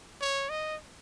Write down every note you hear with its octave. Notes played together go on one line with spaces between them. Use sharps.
C#5
D#5